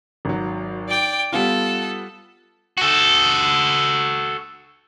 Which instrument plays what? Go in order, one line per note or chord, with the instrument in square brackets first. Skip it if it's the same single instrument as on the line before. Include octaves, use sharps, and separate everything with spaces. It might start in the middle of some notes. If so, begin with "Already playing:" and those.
[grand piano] G#1 F#3
[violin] D5 G5
[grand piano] G3 B3 F4 [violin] A4
[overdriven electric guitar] F#4 A4